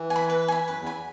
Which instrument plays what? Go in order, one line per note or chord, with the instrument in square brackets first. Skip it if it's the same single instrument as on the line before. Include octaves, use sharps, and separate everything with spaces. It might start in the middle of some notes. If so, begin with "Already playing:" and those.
Already playing: [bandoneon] E3
[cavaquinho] G#5
B5
B4
G#5 B5
[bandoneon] F#2 [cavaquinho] B4
[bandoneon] E2
[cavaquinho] G#5 B5